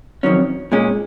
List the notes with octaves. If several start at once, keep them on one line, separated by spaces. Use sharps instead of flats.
F2 D#3 F#3 C#4
A#2 G#3 C#4